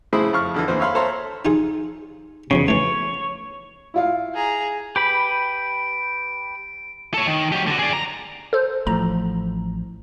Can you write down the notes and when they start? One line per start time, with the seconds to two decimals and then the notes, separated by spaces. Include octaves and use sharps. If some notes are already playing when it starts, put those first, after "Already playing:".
0.13 A2 C#3 E4 G#4 C5 B5
0.33 F2 F5 C#6 F6
0.54 F2 D3 E3
0.68 D#2 E3 B4 C5
0.80 C#5 E5 F5 B5 C6
0.95 A4 C5 C#5 E5 A#5 C6
1.45 D#4 F4 G#4
2.51 E2 C#3 F#3 C#4
2.68 E3 A3 C#5
3.94 E4 F4 F5
4.35 G#4 A#5
4.96 G4 B4 B5 D7
7.14 A4 C#5
7.26 D#3
7.52 F#3 G4
7.67 D3 F#4
7.79 G#4 D5
7.93 A#5
8.53 A4 C5
8.87 A1 A2 F3 A#5